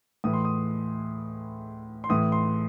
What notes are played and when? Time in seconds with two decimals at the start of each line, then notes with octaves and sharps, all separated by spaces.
0.24 A2 E3 D#6
0.33 C6
0.45 D#6
2.04 C6
2.09 A2 E3 D#6
2.32 C6